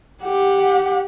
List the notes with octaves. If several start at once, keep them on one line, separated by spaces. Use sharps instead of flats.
G4 F#5